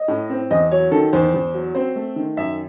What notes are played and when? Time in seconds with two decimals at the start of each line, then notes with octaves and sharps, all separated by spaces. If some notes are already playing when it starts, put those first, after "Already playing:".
Already playing: D#5
0.08 A2
0.30 C4
0.51 E2 D#5
0.71 F#3 C#5
0.92 D#3 A4
1.13 E2 C5
1.34 E2
1.54 F#3
1.75 C4 C5
1.96 A3
2.16 D#3
2.37 F#2 E5